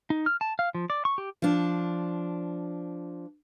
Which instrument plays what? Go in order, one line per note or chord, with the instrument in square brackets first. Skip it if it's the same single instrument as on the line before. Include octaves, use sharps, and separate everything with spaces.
[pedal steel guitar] D#4
F6
A5
F5
F3
D5
C#6
G4
[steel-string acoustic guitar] F3 D4